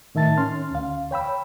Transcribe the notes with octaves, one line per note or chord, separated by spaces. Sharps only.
A2 D#3 E5 A5 A6
C#4 C6 F6
D2 F5
C#5 G5 B5 E6